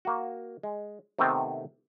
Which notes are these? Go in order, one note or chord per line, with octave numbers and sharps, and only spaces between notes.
A#3 F#4
G#3
C3 D#3 A3 B3 C4